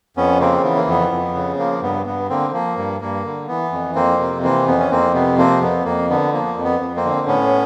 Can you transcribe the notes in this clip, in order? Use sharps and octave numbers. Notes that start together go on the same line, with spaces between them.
F2 B3 C#4
C#3 A#3 C4
E3 B3
A#3
F2 B3
F2
C#3
F3 A#3
G2 B3
G2 B3
D3 A#3 C4
F3 A#3
G2
G2 A#3
D3
E3 B3
F2
F2 A#3 C4
C3
E3 A#3 C4
F2 B3
C#4
F2 A#3 C4
C3 B3
F3 A#3 C4
F2 B3
F2 A#3
D3 B3
F3 A#3
F2
B3
F2
A#3 C4
D3
A2 B3 C#4